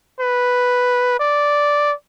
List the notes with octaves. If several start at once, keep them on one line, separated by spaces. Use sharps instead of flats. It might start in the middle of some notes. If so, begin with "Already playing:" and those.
B4
D5